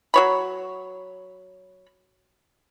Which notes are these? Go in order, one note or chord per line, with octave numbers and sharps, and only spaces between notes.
F#3 C#5 B5